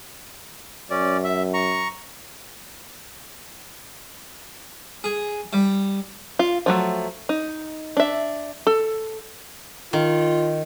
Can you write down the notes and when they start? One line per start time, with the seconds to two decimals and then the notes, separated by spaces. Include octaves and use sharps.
0.90 F#2 C#4 D5
1.24 E5
1.54 A#5 C#6
5.04 G#4
5.53 G3
6.39 F4
6.66 F3 F#3 A3
7.29 D#4
7.97 D4 E5
8.67 A4
9.93 D#3 F4